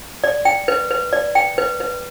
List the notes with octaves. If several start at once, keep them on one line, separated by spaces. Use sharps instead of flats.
D5
G5
B4
B4
D5
G5
B4
B4